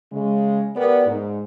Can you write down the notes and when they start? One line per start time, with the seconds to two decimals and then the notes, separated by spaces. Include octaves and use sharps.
0.12 C#3 G#3
0.75 B3 G4 A#4 D5
1.07 G#2